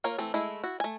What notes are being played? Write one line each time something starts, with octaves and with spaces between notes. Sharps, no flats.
A#3 F4 A#4 C#5
E3 A3 C4
G#3 A3 E4
E4 F#4
A3 G#5